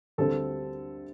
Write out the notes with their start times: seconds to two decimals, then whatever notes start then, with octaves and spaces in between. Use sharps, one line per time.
0.18 D2 D3 G3 C4 A4